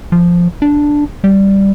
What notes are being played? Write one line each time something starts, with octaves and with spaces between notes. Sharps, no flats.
F3
D4
G3